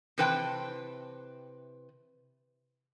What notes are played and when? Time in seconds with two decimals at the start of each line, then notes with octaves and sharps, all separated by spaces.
0.18 C3 E3 B4 C5 G5 A5